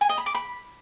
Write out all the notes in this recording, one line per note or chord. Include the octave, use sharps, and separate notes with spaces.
G#5
D#5
B5
D6
B5